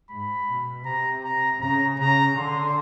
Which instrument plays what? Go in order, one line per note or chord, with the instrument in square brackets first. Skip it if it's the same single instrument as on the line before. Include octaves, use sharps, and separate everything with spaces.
[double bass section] G#2 [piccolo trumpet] B5
[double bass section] B2
[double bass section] C3 [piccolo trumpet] A#5
[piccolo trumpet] A#5
[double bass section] C#3 [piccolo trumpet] A#5
[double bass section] C#3 [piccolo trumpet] A#5
[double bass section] D3 [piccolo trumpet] C6